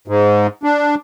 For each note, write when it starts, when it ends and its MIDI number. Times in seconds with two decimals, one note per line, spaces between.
0.08 0.47 44
0.63 0.95 62